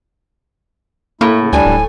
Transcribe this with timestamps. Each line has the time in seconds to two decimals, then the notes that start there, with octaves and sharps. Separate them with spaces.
1.21 A2 A3 A#3 E4
1.40 C#3
1.53 D2 G3 D4 G#5
1.66 D1